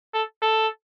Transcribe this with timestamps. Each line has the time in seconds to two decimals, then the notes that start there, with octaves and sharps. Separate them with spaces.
0.14 A4
0.42 A4